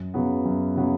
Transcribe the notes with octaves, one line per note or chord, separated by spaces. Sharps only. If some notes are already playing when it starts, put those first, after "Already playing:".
Already playing: F#2
C#3 F#3 B3
F#2
C#3 F#3 B3